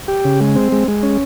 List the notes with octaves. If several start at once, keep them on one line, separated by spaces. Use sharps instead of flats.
G4
C#3
G#3
C4
G#3
G#3
C#4